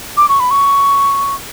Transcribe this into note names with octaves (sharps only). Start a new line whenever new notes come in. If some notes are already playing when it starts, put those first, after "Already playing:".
D6
C#6
B5
C#6